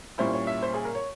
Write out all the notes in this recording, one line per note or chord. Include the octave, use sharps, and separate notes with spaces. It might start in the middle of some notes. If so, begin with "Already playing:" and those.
A#2 G3 C#4 E4 C5
C#5
E5
C5
G#4
A#4
C#5